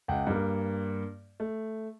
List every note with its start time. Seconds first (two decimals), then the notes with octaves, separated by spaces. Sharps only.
0.08 C#2 F#5 G5
0.27 G2 A#3
1.40 A3